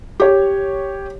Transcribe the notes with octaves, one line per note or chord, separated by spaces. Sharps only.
G4 C#5